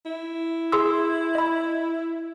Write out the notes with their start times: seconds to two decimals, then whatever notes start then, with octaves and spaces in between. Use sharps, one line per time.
0.06 E4
0.72 G#4 C6 E6
1.35 D#5 B5